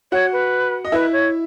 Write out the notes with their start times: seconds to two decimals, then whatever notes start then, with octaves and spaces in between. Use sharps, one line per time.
0.12 F#4 C#5 F#5
0.32 B4
0.85 D#5
0.92 E4 B4 E5
1.13 C#5